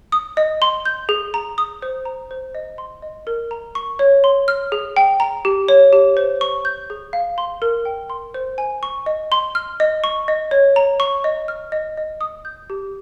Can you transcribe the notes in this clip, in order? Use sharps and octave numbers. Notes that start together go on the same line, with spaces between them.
D#6
D#5
C6
G6
G#4
A#5
D#6
C5
A#5
C5
D#5
C6
D#5
A#4
A#5
C#6
C#5
C6
F6
G#4
G5
A#5
G4
C#5
G4
C5
C#6
G6
G#4
F5
C6
A#4
G5
C6
C5
G#5
C#6
D#5
C6
F6
D#5
C#6
D#5
C#5
A#5
C#6
D#5
F6
D#5
D#5
D#6
G6
G4